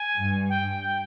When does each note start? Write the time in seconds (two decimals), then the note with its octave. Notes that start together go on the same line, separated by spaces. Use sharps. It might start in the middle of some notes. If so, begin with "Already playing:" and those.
Already playing: G#5
0.15 G2
0.49 G5